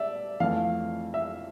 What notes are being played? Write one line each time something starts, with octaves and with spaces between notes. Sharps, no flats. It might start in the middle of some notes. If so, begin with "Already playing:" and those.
Already playing: D5 E5
F2 E3 A3 F5
E5